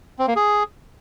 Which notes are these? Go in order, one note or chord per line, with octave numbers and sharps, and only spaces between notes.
C4
A#3
G#4